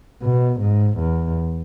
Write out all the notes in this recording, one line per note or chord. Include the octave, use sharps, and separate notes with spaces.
B2
G#2
E2